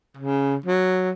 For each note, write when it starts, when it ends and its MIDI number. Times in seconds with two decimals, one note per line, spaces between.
0.17 0.56 49
0.66 1.11 54